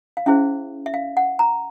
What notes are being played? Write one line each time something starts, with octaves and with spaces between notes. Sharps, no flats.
F5
C#4 E4 G#4 C5 E5
E5
F5
F#5
A#5